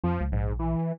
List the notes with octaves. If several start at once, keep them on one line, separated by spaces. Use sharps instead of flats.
F2 F3
C#2
A#1 G#2
E3